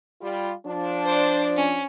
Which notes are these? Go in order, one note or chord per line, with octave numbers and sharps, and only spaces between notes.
G3 F4
F3 D4
C5 D5
C#4